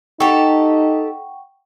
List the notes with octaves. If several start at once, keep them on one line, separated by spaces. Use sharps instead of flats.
D#4 G4 A4 F#5 G5 C#6